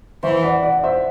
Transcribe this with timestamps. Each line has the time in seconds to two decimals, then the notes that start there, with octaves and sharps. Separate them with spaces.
0.23 E3 C5 E5
0.43 D5 F#5
0.63 D5 F#5
0.83 C5 E5